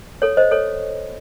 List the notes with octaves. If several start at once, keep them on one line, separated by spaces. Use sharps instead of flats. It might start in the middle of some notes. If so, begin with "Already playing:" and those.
A4 C#5
C5 D#5
A4 C#5